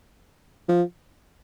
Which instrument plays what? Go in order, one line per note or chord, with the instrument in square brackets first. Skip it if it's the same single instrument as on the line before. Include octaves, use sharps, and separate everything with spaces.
[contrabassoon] F3